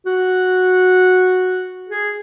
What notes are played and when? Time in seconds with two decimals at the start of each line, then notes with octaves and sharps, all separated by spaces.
0.06 F#4
1.89 G#4